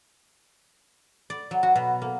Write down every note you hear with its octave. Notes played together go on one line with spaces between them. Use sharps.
D5
F#3
F#4
B2
A#3